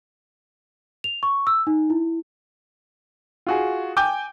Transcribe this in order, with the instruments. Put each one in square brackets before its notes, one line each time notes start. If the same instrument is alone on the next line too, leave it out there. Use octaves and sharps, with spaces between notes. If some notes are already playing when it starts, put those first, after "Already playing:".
[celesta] F7
C#6
E6
D#4
E4
[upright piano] F4 F#4 G#4
G5 G#5 D6 G6